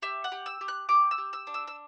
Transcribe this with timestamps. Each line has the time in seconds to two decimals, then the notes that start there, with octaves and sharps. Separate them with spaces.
0.02 G4 E5
0.24 F#5
0.32 G4
0.46 E6
0.61 G4
0.68 F#6
0.89 G4 D6
1.11 E6
1.18 G4
1.33 E6
1.47 D4
1.54 E6
1.67 E6